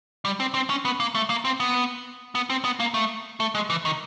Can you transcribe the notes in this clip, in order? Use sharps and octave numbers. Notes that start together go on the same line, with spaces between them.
G3
C4
C4
C#4
B3
A#3
A3
A#3
C4
B3
B3
C4
B3
A#3
A3
A3
G#3
E3
D#3